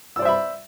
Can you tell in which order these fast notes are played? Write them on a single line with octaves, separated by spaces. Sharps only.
E6 D5 C5 E5 B5